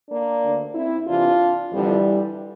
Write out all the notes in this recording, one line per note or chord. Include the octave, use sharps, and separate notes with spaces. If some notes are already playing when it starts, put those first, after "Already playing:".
A#3 D4
D2 D3
C4 E4
E2 C3 E3 D4 F4
F2 D3 E3 G3